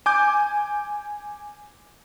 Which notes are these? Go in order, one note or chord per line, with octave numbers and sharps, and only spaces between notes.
G#5 D6 G6